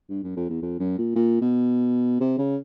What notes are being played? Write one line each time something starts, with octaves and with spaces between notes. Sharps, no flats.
G2
F#2
F2
E2
F2
F#2
A#2
A#2
B2
C3
C#3